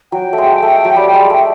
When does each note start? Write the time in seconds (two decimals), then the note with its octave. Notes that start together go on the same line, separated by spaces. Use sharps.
0.12 F#3 G5
0.33 A3
0.38 G#3
0.62 A3
0.84 F#3
0.96 G3
1.13 G#3
1.30 A3